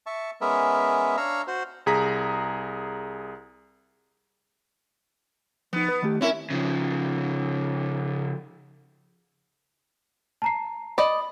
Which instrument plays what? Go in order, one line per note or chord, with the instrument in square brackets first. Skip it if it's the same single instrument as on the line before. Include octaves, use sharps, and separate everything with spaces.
[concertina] E5 A5 C#6
G#3 B3 C#4 A#4 E5
D4 C#5 F5 A#5 E6
F#4 C5
[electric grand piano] C2 G#4 A#5 B6
[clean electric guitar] F3 D#4 [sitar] B3
[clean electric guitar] B4
D#3 A3 G4
[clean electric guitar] C4 A#4 [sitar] C#4 E4
[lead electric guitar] C#3 F3
[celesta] A5 A#5 C7
[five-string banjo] D5 D#5 [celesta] B5 F#7